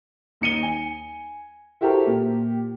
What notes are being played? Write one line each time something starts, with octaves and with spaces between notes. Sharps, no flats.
D#2 D#4 C#7 D#7 G7
G#5
E4 F#4 G4 A4 A#4 C5
A#2 G4